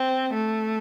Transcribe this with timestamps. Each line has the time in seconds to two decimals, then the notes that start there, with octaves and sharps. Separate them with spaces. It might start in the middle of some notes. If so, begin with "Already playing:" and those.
Already playing: C4
0.34 A3